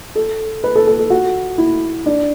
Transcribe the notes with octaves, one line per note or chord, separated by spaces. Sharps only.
A4
B4
A4
A4
A4
F#4
E4
D4